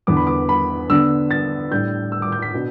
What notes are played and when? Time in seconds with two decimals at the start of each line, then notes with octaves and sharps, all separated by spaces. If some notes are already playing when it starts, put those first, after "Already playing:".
0.07 E2 D3 B3 D6
0.17 B5
0.27 D6
0.49 B5
0.90 D3 B3 D4 E6
1.31 A6
1.71 A2 G3 D4 G6
2.12 E6
2.22 D6
2.32 G6
2.42 B6
2.53 B2 B3 D4